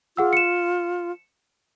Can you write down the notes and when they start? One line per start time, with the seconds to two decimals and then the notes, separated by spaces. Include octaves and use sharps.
0.17 F4 G#4 F#5 E6
0.33 C#7 E7